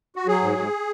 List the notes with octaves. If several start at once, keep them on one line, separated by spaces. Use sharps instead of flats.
F#4
F#3 G#4
G#2
G#2